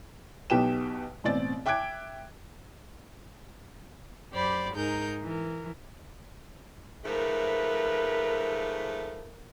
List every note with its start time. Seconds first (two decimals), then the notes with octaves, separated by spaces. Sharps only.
0.50 B1 B2 G4 B4 G5 E7
1.24 A1 B2 C4 D5 A6
1.66 E5 G5 D6 F#6 G#6 D7
4.33 F#2 G4 C5 D5 B5
4.75 G#2 D#4 G#4 A#4 G6
5.23 E3 A#4
7.05 G#2 F3 A3 A#4 B4